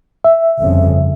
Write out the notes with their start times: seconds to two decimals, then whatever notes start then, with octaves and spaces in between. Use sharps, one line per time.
0.24 E5
0.61 G1 F2 C#3